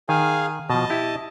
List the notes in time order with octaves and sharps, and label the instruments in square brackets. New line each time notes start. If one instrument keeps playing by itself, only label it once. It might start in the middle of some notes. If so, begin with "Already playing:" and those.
[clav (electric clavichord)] D#3 [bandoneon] G#4 F5 G#5
[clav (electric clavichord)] B2 F3 [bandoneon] D#5 A5
[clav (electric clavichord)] E4 G4